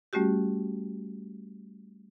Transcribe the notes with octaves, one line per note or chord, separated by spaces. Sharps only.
G3 A3 C#4 F#4 G4